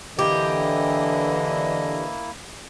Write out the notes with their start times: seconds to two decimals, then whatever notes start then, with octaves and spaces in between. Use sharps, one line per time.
0.19 D3 E3 A#3 E4 G4 D#5